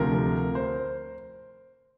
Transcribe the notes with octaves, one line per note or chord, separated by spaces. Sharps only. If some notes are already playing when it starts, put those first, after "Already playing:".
Already playing: D2 C3 F3 A#4
C5